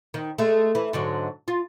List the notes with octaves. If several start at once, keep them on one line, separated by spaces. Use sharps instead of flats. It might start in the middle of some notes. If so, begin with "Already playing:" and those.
D#3
G#3 A3
E3
G#2 D3 F#3
F4